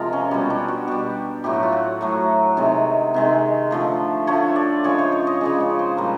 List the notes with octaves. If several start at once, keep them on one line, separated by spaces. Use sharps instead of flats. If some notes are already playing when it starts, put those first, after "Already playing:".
Already playing: C3 F3 G#3 F4 A#4
C#4
B2 G3 C#4
D4
F#4
B2 G3 G4
A2 F#3 A3 G4
F#4
F4
F#4
A2 F#3 A3
C3 D#3 G#3
C3 D#3 G#3
D3 F3 A3
D3 F3 A3 C#5
D5
C#3 F3 G#3 C#5
C5
C#5
D#5
C#3 F3 G#3 D5
C#5
C5
A#2 G3 A#4